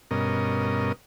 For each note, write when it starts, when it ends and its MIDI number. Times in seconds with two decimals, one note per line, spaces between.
0.11 0.92 43
0.11 0.92 47
0.11 0.92 61
0.11 0.92 70
0.11 0.92 75